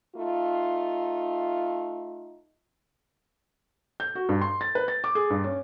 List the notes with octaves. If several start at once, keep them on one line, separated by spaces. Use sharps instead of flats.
A3 D#4 F4
G6
F#4
G2
C6
A6
B4
A6
D6
G#4
G2
C#4